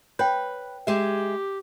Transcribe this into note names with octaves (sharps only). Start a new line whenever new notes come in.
B4 C#5 G5
G#3 G4 E5